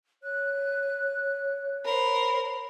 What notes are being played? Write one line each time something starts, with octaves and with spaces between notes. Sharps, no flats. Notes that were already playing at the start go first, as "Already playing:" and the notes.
C#5 F#6
A#4 C5 B5